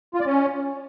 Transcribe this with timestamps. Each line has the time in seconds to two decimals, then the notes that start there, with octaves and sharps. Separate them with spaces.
0.14 F4
0.20 D5
0.26 C#4